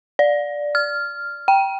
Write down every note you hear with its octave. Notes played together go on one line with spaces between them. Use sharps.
D5
F6
G5